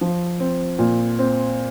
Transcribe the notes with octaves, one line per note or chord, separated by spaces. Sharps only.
F3
C4
A#2
C4